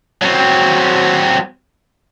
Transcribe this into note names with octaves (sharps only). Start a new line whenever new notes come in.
F#3 C4